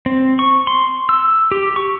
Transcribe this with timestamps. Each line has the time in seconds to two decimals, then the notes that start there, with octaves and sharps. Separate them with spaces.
0.06 C4
0.39 C#6
0.67 C6
1.09 E6
1.52 G4
1.76 C#6